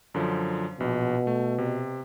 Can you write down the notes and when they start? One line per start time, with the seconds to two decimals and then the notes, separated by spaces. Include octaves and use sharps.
0.14 F#2 D3 F3
0.80 A#1 B2
1.27 A3
1.58 C3